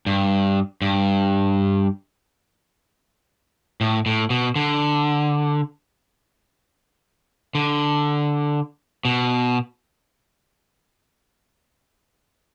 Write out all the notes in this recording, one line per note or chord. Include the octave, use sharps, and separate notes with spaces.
G2
G2
A2
A2
B2
D3
D3
B2